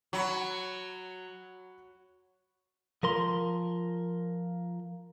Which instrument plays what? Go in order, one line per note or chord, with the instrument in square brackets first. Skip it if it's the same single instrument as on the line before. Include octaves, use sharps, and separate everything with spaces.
[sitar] F#3 [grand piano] F#5 B5 C#6
[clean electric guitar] F3 A#4 C6